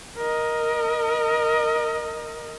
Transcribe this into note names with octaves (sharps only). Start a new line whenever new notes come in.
A#4 D#5